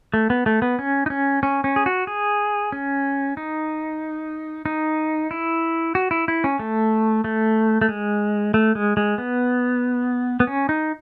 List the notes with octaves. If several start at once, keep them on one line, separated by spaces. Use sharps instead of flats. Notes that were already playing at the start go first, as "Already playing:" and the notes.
A3
B3
A3
B3
C#4
D#4
C#4
C#4
C#4
G#4
F#4
G#4
C#4
D#4
D#4
E4
F#4
E4
E4
C#4
A3
A3
A3
G#3
A3
G#3
G#3
B3
B3
C#4
D#4